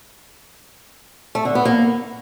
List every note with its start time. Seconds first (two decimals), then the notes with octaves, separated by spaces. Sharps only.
1.35 A3
1.45 D3
1.55 B3
1.65 A#3